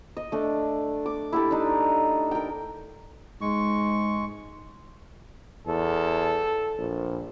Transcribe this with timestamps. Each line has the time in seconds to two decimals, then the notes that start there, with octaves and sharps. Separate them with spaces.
0.17 D#5
0.32 A3 D4
1.06 D6
1.32 E4 G4 A4
1.51 D4 D#4
2.31 A#4 G5
3.41 G#2 G#3 C#6
5.67 E2 A4
6.78 A#1